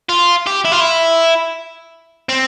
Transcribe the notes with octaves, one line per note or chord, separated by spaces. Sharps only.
F4
G4
E4
F4
E4
C4